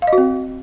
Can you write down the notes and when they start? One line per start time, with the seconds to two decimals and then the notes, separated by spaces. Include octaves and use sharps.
0.02 F5
0.07 D#5
0.13 F#4
0.18 C4